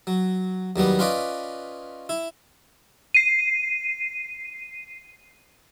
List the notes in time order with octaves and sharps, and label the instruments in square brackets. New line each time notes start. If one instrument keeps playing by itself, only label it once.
[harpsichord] F#3
D#2 F#3 G3 B3
C#4 F4 B4 D5 D#5
E4
[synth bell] C7 D#7